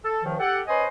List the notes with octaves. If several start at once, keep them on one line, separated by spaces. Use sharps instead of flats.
A4
C#2 D#3 F3
G4 A4 F#5
C#4 B4 C5 D#5 G#5